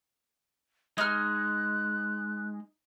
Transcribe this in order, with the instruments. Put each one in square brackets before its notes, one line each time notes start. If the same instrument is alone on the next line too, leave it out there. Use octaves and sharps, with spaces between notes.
[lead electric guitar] G#3 [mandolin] D#4 F6 [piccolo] F#6